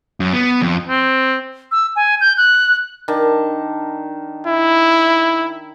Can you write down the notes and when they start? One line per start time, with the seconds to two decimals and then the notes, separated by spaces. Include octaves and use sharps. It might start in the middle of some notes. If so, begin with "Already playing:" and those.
0.20 F#2
0.33 B3
0.62 F2
0.89 C4
1.72 E6
1.96 G#5
2.21 G6
2.37 F#6
3.08 D#3 D4 A5
4.47 E4